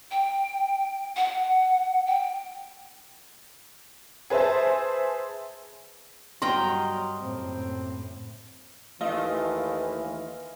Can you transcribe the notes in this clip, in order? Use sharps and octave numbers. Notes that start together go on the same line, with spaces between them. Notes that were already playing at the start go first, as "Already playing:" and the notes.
G5
F#5
G5
G#4 B4 C5 E5 A5
G2 F#3 G3 A#4 D#5 G5 C6
F#1 A2 C4
D#2 E3 A3 F4 D#5